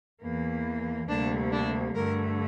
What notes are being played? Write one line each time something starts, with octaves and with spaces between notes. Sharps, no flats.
E2 E3 A#3
D2 C3 G3 A#3 D4
D4
G2 D3 A3 A#4